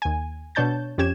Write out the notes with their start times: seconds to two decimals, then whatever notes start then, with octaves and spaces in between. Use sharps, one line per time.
0.02 D#2 G#5
0.55 B2 D4 C#5 A5 G6 A6
0.98 F2 C#4 G4 G#6 E7